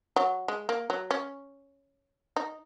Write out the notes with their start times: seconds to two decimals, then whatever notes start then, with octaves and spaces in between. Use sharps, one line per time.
0.16 F#3
0.48 G#3
0.69 A#3
0.90 F#3
1.11 C#4
2.36 D#4